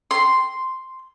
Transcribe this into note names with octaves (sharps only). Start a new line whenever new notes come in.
C6